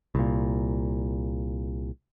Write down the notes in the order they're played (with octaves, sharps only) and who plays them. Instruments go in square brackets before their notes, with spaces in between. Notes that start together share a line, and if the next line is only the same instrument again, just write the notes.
[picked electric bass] C2 A#2